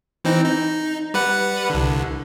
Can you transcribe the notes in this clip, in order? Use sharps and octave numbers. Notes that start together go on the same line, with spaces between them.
E3 C4 D#4
D#4
G3 B4 F#5
C2 D3